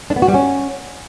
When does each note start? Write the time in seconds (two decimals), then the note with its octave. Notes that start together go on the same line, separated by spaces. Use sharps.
0.10 D4
0.16 B3
0.22 F#4
0.28 G3
0.34 C#4